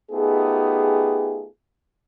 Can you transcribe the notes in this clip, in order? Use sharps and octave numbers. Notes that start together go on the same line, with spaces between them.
A3 B3 D#4 F4 G4 G#4